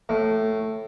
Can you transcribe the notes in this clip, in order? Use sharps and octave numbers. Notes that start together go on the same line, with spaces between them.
A2